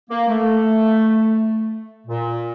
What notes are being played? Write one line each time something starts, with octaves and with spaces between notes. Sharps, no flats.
A#3
A3
A#2